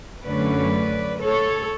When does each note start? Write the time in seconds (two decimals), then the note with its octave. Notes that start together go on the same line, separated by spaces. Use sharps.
0.24 F#2 D3 A3 C#4 B4 D5
1.22 A4 C#5